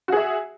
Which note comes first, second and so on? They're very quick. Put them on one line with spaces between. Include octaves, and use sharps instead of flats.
F#4 G#4 E5